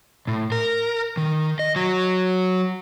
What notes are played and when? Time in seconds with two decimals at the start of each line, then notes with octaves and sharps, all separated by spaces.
0.27 A2
0.52 A#4
1.17 D#3
1.59 D#5
1.76 F#3